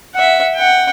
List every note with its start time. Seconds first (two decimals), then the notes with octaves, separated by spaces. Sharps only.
0.14 E5 F#5
0.54 F#5 G5